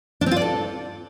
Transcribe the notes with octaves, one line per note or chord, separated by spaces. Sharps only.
D4
C4
F4
D5
A4